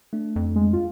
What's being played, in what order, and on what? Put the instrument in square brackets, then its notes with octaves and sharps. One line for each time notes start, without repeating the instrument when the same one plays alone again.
[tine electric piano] A3 D4
[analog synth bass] F2
[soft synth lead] G#3
F4